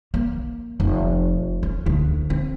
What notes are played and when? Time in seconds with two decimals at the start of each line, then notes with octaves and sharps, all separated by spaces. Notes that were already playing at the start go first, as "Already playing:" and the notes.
0.14 A#3
0.80 F1
1.63 C#4
1.86 D2
2.30 C4